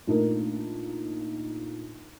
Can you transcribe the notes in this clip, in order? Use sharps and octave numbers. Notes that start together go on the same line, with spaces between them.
A#2 A3 D4 D#4 A#4